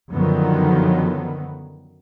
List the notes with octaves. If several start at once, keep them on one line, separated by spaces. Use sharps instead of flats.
F#2 D3 D#3 F3 F#3 B3